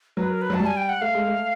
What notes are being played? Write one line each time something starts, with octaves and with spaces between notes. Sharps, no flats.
F#3 B4
A#4
B4
F#3 A5
G3
G#5
G5
F#5
A3 F5
G#3
A3